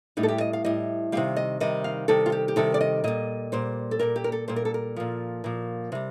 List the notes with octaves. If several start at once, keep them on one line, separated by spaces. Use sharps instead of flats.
A2 G3 D#4
A4
G4
D#5
F5
A2 G3 D#5
C3 D#3 G3 F5
D#5
C3 D#3 G3 D#5
F5
C3 D#3 G3 A4
F4
G4
G4
C3 D#3 G3 A4
D5
D#5
A#2 G3 D#5
A#2 G3 C5
A4
A#2 G3 A#4
G4
A#4
A4
A#2 G3 C5
A#4
A4
A#4
A#2 F3
A#2 F3
C3 G3